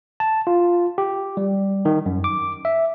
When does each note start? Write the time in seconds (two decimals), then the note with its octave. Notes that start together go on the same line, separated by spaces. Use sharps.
0.20 A5
0.47 F4
0.98 G4
1.37 G3
1.85 D#3
2.06 F#2
2.24 D6
2.65 E5